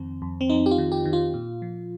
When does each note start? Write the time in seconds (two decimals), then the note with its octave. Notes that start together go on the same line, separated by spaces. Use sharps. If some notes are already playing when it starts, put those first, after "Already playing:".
Already playing: F2 D#3 C4
0.22 F2
0.41 C4
0.50 F2 D#4
0.66 G4
0.71 F4
0.78 D#3
0.92 G4
1.05 D#3
1.13 F4
1.34 A#2
1.62 F3